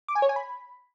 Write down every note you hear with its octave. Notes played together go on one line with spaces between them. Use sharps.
D6
G#5
C#5
G#5
B5